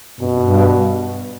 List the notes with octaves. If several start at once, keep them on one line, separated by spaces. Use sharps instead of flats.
G2 B2
F#2
G2